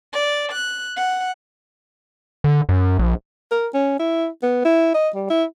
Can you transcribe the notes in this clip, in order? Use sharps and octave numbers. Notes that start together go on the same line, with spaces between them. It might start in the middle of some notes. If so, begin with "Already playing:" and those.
D5
F#6
F#5
D3
F#2
A#1
A#4
C#4
E4
B3
E4
D#5
G3
E4